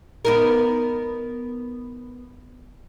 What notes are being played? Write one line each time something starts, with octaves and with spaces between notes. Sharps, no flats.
B3 D#4 A#4